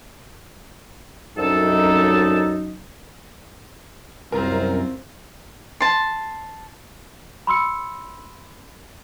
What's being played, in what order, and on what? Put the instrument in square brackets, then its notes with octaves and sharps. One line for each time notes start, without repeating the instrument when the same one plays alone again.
[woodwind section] C2 A4 [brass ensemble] F#2 D#4
[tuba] C2 [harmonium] F#2 [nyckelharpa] C4 F4 [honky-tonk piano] A#4
[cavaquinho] A5 C6
[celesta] B5 C6 E6 C#7